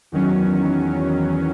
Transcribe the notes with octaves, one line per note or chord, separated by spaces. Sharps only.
E2 D#3 F#3 C#4